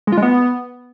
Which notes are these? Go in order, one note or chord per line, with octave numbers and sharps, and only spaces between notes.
G#3
F4
G#3
B3